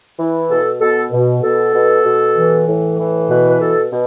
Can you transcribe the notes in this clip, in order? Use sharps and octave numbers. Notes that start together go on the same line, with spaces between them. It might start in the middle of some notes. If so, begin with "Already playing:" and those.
E3
B2 A4
B2 A4
B2
B2 A4
B2
B2
E3
A2
E3
B2 B4
B4
B2 A4
B2